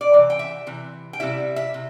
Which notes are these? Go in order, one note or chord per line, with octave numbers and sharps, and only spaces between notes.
D5
C3 E3
G5
E5
C3 E3
G5
C3 G3 E4 E5
E5
C3